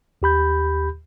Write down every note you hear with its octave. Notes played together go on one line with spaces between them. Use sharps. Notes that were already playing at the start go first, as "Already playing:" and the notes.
D#2 G4 B5 G6